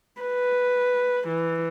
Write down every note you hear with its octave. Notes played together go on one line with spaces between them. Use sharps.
B4
E3